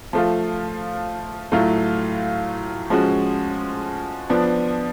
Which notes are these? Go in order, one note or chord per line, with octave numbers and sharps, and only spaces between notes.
F3 A3 F4
A2 F#3 A3 F4
F3 G#3 C#4 F#4
F3 B3 D4